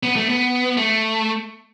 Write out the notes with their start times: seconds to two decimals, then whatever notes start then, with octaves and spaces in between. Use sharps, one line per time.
0.03 B3
0.16 A3
0.29 B3
0.77 A3